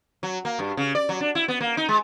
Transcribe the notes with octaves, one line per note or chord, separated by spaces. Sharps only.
F#3
A#3
G2
C#3
D5
F#3
D4
E4
B3
A#3
D#4
G#3